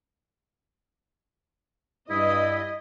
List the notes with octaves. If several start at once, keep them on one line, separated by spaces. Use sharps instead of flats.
G2 E4 D#5 D#6